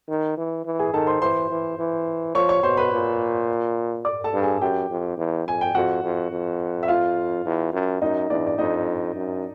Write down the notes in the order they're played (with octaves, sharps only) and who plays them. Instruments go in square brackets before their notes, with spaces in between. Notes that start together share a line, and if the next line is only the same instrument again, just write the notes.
[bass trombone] D#3
E3
E3
[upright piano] G#4 G#5
[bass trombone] D#3 [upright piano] A4 A5
[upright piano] C5 C6
[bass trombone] E3 [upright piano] C5 C6
[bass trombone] E3
E3
[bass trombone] F3 [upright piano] C#5 C#6
[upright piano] C#5 C#6
[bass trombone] B2 [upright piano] C5 C6
[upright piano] B4 B5
[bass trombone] A#2
[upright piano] D5 D6
A4 A5
[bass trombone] G2
[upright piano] G#4 G#5
[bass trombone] F#2 [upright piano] G4 G5
[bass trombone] F2
E2
[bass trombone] F2 [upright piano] G#5
[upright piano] G5
[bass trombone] F2 [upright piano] F#4 F#5
[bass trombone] F2
F2
[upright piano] E5
F4 F5
[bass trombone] E2
F#2
[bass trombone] F#2 [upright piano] D#4 D#5
[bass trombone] E2 [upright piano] D4 D5
[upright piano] D5
[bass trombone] F2 [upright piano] D#4 D#5
[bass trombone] F#2